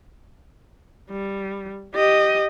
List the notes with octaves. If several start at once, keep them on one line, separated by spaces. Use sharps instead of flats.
G3
G4 D#5